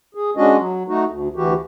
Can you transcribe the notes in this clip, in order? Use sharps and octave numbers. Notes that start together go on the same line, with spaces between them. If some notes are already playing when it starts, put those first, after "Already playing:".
G#4
G#3 C#4 D4 F#4 D#5
F#3
A3 D#4 F#4
D2
D2 E3 F#4 G4